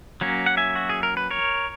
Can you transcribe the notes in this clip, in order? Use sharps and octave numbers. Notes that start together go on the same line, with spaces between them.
F#3 A#3 C#4
F#5
E5 G#5
F#4
G#4
A#4
B4
A#4 C#5